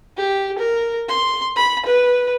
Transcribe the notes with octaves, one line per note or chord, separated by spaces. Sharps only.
G4
A#4
C6
B5
B4